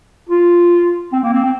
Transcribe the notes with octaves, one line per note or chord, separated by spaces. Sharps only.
F4
C4
A#3
C4
C4